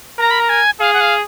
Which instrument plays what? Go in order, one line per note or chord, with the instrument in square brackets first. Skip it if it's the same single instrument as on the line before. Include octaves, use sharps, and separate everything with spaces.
[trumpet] A#4 [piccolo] A#5
[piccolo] B5
A#5
G#5
[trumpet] G#4 [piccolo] F5
[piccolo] F#5
F5